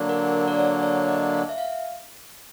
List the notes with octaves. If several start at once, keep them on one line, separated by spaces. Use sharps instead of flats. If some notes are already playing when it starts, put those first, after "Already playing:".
Already playing: D3 F#3 A#3 D4
A#4
D5
C#5
C#5
D#5
F5
E5
F5